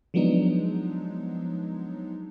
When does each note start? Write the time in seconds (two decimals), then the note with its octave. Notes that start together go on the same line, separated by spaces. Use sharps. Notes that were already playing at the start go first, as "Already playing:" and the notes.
0.14 F3 F#3 G#3 B3 D4 D#4